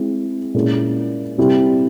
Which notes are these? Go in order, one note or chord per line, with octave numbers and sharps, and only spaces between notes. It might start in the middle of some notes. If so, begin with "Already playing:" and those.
Already playing: G#3 C4 E4
A#2 G#3 C#4 E4
C3 G3 C4 E4 G4